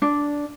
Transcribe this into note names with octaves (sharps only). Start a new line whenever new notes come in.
D4